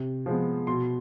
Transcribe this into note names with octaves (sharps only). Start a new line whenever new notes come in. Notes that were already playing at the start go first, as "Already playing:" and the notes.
Already playing: C3
F3 G#3 B3
B2 C6